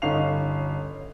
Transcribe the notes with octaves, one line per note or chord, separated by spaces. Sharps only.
G1 C#4 D#4 F5 C7 F7